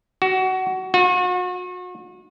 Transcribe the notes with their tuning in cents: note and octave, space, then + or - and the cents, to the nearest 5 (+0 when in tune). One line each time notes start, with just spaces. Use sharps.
F#4 +20
F#4 -40